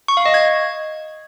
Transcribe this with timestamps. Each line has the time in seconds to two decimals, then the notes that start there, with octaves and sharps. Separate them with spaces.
0.08 C#6
0.17 F5
0.26 D#5
0.34 G#6